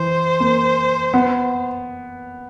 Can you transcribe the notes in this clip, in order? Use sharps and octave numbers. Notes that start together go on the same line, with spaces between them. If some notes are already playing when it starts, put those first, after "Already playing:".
Already playing: E3 C5
A#3
B3